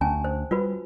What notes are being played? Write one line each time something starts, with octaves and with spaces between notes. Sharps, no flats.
D2 C#4 G#5 A5
C5
G3 F4 F#4 B4